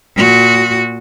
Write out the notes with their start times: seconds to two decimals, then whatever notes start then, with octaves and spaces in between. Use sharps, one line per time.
0.15 A#2 F#4